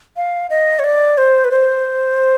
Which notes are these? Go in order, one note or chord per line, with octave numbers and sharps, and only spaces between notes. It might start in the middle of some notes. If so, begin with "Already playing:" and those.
F5
D#5
C#5
D5
C5
B4
C5